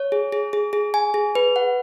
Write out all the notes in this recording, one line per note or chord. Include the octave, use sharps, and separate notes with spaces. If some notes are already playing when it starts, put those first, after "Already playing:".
Already playing: C#5
G#4
G#4
G#4
G#4
G#5
G#4
B4
F#5